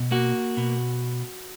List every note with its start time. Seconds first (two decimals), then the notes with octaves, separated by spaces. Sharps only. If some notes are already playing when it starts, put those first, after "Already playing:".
Already playing: B2
0.11 A#3 F#4
0.57 B2